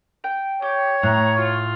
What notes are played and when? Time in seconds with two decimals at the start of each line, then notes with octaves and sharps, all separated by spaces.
0.24 G5
0.62 G4 C#5
1.03 A2 A#5 F#6
1.40 F4